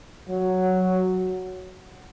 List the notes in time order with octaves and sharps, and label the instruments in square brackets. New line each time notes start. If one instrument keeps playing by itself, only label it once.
[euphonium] F#3